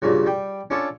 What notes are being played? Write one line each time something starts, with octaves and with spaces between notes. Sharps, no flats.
G2 A#2 C#3 F#3
G3 G5
C#4 D4 F4 A4 C#5